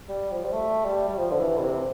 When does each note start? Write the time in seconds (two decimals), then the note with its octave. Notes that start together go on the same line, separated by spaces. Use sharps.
0.09 G3
0.31 F3
0.44 G3
0.53 A3
0.85 G3
1.08 G3
1.17 F3
1.32 D3
1.39 E3
1.56 D3
1.60 C3